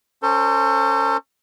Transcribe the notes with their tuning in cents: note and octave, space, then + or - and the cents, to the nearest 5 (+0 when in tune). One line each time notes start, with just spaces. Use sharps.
C#4 +0 A4 +40 C5 +0